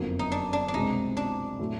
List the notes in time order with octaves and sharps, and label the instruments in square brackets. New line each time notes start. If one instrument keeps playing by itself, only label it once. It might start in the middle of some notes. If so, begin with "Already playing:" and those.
Already playing: [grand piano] F#1 F2 D3 F#3 A#3 [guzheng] B3
[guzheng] D#4
D4
D4
D4
[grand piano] C2 B2 G#3 C4 [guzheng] D#4
[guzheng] D4
[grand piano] A2 F#3 A3